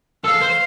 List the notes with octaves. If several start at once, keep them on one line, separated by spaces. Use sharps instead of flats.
A4 F5
C5